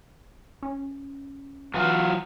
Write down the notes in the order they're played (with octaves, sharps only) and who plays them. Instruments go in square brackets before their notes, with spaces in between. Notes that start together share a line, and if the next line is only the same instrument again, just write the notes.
[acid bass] C#4
[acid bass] E3 [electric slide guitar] F#3 F4 F#4